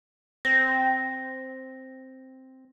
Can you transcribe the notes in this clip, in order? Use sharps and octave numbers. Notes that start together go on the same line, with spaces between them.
C4 A#6